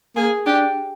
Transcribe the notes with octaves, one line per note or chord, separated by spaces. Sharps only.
A#3 G#4
D4 G4